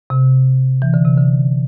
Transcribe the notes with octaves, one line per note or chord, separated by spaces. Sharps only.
C3
E3
D3
C3
D3